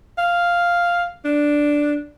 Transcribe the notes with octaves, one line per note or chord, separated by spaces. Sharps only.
F5
D4